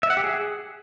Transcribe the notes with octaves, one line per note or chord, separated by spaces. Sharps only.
E5
F#5
G4
G#4